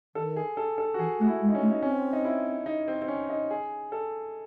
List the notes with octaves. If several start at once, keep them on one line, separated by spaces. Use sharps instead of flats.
D#3 A4
G#4
A4
A4
F#4
E3 G#4
A3 F#4
E4
G#3
D#4
C#4
A3
D#4
C4 C#4
D#4
E4
D#4
C4
C4
C#4
D#4
G#4
A4